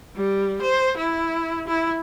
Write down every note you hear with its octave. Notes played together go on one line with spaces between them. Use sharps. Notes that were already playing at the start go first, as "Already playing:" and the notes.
G3
C5
E4
E4